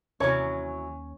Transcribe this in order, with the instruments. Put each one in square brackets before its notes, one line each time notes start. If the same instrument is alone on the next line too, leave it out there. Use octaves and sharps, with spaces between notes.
[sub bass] D#2 [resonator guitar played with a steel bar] C3 E3 F#3 [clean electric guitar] C#4 [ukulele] C#5